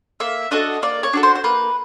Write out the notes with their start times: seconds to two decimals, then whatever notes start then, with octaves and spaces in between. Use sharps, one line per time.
0.20 A#3 E5
0.51 D4 F#4 A4 D#5
0.82 A#3 D5
1.03 C#5
1.13 D4 F#4 A4
1.23 C5
1.35 C5
1.44 A#3 B4